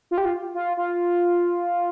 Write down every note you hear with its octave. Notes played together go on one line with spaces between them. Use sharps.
F4
G4
F4
F4
F4